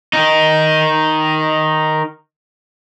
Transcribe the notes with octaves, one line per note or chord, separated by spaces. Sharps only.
D#3 D#4